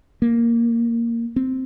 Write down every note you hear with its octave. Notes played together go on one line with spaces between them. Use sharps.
A#3
C4